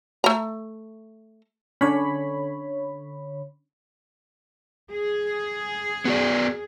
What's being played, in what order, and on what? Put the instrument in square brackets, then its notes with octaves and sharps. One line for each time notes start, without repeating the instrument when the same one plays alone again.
[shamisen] A3 A#5
[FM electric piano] D3 C#5 B5 [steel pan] C#4 D4
[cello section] G#4
[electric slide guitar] B3 F#4 D5